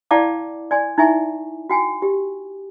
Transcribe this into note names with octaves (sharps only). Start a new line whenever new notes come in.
E4 D5 F5 G5 A5 D6
D5 G#5 C6
D#4 E4 E5 G#5 C#6
F#4 G5 G#5
G4